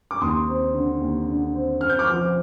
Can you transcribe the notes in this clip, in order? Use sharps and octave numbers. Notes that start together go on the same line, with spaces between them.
D6
D#2 C6 D#6
C4
D3
D#2
D3
C4
C4 F6
G6
D6 F6
F3